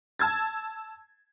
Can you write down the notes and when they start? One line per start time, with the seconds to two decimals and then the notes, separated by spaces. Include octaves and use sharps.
0.19 A5 E6 G#6 A6